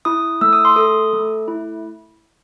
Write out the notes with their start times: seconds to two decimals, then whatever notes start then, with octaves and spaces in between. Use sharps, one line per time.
0.05 E4 D#6
0.41 A3 E6
0.53 D#6
0.65 C6
0.76 A4 D#6
1.13 A3
1.48 E4